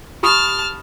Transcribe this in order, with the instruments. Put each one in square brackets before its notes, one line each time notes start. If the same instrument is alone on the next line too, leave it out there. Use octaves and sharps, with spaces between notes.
[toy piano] G4 B5 D#6 [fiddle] A5 F6